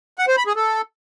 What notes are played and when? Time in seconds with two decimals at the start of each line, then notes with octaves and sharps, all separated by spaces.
0.19 F#5
0.28 C5
0.37 B5
0.47 G#4
0.56 A4